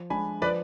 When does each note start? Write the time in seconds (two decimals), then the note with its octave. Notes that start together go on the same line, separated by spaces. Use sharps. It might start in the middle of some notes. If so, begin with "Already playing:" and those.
Already playing: F3
0.10 G#3 D4 G#5 B5
0.41 F3 B4 D5